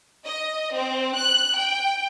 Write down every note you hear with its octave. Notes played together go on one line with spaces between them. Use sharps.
D#5
C4
F#6
G5